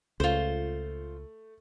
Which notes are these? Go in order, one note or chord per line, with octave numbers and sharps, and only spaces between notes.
C#2 A3 F4 C5